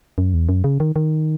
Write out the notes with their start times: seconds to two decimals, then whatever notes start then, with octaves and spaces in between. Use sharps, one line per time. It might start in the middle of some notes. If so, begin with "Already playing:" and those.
0.18 F#2
0.34 E2
0.49 F#2
0.64 C#3
0.80 D#3
0.96 D#3